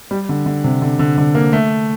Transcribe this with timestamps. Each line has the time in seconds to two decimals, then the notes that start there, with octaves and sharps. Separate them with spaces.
0.11 G3
0.29 D3
0.46 D3
0.64 C3
0.82 D3
0.99 D3
1.18 D3
1.35 A#3
1.53 A3